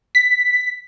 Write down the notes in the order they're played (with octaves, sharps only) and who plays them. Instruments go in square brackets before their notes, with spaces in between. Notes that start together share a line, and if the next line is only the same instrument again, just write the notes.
[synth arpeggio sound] B6